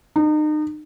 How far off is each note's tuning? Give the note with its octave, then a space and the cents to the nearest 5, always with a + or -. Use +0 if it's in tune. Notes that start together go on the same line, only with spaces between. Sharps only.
D#4 -35